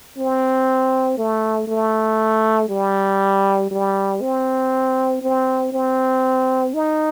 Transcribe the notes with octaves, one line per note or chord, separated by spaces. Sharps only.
C4
A3
A3
G3
G3
C4
C4
C4
D#4